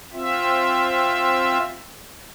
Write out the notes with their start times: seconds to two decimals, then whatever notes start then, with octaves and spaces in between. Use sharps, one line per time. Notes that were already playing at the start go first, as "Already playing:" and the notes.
0.13 C4 F4 E5